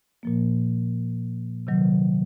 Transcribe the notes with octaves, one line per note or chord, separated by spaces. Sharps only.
A#2 F3 A#3
C3 D#3 F#3